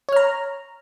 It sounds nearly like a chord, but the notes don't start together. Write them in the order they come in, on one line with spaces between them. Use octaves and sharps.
C#5 F6 A#5